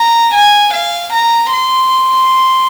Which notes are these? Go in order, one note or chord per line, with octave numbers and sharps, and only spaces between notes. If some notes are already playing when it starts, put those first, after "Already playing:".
Already playing: A#5
G#5
F5
A#5
C6